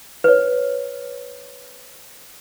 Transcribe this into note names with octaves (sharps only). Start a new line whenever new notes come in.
B4 C#5